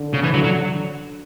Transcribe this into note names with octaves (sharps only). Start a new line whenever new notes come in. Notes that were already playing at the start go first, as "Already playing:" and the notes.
Already playing: D3
C#3
E3
D3 F#3
F#3